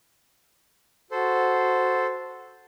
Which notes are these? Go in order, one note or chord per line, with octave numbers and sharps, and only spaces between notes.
F#4 A4 C5